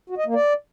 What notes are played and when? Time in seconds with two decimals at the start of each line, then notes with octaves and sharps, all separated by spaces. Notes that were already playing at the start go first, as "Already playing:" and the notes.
0.10 F#4
0.18 D#5
0.26 A#3
0.35 D5